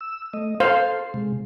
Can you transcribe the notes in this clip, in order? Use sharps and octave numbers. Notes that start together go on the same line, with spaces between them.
E6
A3 D#5
A4 C5 F5 C6
C3 G#3